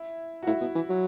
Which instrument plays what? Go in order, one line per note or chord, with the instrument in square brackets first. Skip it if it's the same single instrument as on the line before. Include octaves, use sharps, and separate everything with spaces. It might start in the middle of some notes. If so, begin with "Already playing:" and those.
Already playing: [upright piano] E4
F#4
[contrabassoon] A2 [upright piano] E4
[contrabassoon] B2
E3
F#3